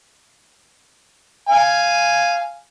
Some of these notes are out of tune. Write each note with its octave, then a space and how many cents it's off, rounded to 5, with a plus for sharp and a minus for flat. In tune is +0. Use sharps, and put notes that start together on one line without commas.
F5 -5 G#5 +0